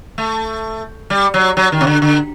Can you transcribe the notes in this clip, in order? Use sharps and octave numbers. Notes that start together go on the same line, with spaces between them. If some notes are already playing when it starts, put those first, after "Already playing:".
A3
G3
F#3
F#3
D#3
C3
D3
D3